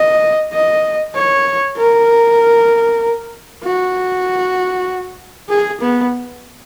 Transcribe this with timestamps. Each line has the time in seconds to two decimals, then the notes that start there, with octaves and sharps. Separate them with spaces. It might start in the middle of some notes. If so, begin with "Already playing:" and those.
Already playing: D#5
0.53 D#5
1.15 C#5
1.77 A#4
3.63 F#4
5.49 G#4
5.81 B3